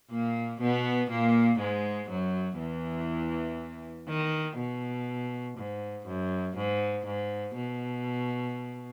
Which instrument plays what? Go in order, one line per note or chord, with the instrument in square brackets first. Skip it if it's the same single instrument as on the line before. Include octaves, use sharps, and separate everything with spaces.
[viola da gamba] A#2 A#3
B2 B3
A#2 A#3
G#2 G#3
F#2 F#3
E2 E3
D#3
B2
G#2
F#2
G#2
G#2
B2